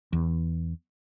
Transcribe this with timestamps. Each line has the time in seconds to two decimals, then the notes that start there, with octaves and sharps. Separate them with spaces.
0.13 E2